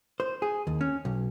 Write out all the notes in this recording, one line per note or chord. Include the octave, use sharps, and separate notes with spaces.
C5
G#4
D#2
C#4
B1